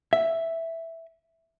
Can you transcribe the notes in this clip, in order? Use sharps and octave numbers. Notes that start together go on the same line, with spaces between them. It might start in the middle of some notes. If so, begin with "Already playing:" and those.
E5